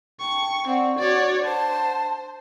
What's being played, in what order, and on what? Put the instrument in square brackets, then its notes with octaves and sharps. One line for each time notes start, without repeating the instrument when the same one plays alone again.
[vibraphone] G5 A5 [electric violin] C#6
[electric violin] C4 [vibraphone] D5 F#5 C#6
[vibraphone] D4 F#5 [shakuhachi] F#4 [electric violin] C#5 D5
[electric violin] C5 [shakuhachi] A5